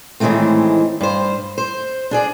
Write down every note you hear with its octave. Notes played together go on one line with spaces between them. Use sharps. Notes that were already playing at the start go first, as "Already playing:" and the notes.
A2 D#3 E3 G#3 A3 C4
G2 C5
C5
D4 G#4 D5